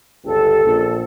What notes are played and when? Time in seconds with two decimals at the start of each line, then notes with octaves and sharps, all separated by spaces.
0.25 G1 C#2 G4 A4
0.64 A#1